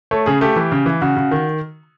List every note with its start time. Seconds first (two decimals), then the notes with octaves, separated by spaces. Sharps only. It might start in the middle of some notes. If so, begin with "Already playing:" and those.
0.11 A3 C#5
0.26 C#3 G#4
0.41 A3 G4
0.56 E3
0.72 C#3
0.86 E3
1.02 C#3 F#4
1.17 C#3
1.31 D#3